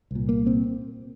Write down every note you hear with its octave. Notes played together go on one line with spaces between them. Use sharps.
C2 A#2
A#3
C4